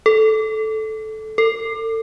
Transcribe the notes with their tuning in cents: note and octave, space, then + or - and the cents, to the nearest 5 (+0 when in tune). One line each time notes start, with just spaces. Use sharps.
A4 -10
A4 +35